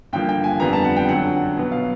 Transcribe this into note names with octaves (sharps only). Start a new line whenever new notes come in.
G2 D3 F3 A#3 G5
G5
G#5
F2 D3 G3 B3 A#5
A5
F#5
G5
F#2 D3 F#3 F#5
B2 F#3 B3
F5